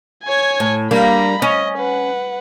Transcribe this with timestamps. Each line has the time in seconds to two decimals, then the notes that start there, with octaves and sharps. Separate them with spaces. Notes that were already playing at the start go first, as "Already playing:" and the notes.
0.23 C#5 G#5
0.60 A2
0.91 G3 A#3 D4 A#5 B5
1.42 C#4 D#5
1.78 B4 F#5